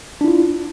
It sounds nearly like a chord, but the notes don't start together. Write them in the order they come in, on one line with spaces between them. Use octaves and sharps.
D4 E4 F4